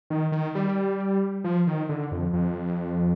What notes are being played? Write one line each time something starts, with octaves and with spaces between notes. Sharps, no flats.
D#3
D#3
G3
F3
D#3
D3
F2
F2